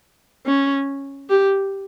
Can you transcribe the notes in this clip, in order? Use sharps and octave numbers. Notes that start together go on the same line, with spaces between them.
C#4
G4